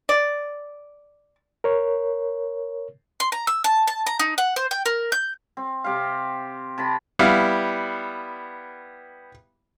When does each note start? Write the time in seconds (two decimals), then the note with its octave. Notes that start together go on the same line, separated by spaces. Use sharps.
0.09 D5
1.64 A#4 C#5
3.20 C6
3.32 A#5
3.47 E6
3.64 A5
3.87 A5
4.06 A#5
4.19 D#4
4.38 F#5
4.56 C5
4.71 G5
4.86 A#4
5.12 G6
5.57 C4
5.84 C3 G4 C5 F5
6.78 C3 A5 B5
7.19 G3 B3 E4 F5